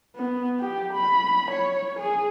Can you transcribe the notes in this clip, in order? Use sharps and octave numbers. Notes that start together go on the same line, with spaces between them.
B3
G4
B5
C#5
G#4